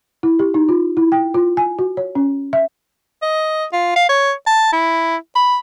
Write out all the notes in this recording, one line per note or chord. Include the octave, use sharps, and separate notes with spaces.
E4
G4
D#4
F4
E4
G5
F4
G#5
F#4
C#5
C#4
E5
D#5
F4
F5
C#5
A5
E4
B5